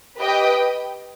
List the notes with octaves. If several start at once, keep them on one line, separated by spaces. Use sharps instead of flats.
G4 B4 D#5 G5